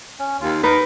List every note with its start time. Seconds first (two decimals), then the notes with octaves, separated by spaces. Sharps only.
0.19 C#4
0.41 D#2 F4
0.63 D#4 A#4 B4